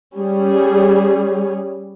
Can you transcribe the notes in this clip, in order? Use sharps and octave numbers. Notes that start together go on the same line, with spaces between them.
G3 C#4 G#4